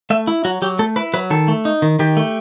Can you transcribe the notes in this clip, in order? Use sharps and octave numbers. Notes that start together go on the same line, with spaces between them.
A3 E5
E4
F#3 F#4
F#3 G4
A3 A4
E4 B4
F#3 B4
D#3 A4
A3
D#4
D#3
D#3 G4
A3